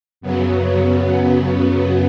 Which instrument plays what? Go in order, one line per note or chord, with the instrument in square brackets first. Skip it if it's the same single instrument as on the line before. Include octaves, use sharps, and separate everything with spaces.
[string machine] F#2 C#3 F#3 B3